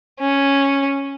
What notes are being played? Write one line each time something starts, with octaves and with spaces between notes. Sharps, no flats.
C#4